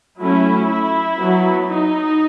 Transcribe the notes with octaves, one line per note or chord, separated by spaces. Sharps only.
F#3 A3 C#4 E4
E4
F#3 B3
D#4